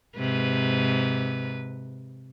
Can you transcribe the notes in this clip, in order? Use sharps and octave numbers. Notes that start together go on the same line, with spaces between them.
G#2 C3 B4